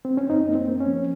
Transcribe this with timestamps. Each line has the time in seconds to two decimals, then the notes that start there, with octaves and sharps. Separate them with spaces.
0.05 C4
0.17 C#4
0.30 F#2 C4 D#4
0.49 A#3
0.55 C4
0.68 A#3
0.81 C#4
0.87 F3